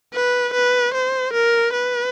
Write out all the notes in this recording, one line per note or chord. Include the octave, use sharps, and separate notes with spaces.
B4
B4
C5
A#4
B4